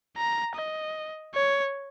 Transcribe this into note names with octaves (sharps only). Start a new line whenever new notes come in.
A#5
D#5
C#5